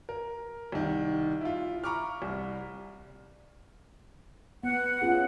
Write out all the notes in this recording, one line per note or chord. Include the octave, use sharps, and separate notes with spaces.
A#4
C2 D#3
E4 F4
A#5 B5 C#6 D6 F6
C2
B3 F#5
C#4 F4 G#4